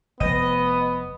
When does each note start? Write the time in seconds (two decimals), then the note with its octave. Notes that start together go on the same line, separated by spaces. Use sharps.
0.20 F1 B3 D#5